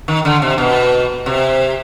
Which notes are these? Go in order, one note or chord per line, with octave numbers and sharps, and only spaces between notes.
D#3
D3
C3
B2
C3